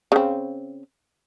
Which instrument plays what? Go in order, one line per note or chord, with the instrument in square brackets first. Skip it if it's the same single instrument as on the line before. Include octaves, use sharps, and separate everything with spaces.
[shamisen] C#3 C4